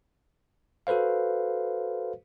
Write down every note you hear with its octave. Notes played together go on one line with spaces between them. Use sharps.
F#4 A4 B4 C5 F5